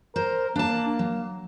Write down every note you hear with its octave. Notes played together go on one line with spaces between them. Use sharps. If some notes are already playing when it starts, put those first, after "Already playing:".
A#4 C5
A#3 D4 A5
F#3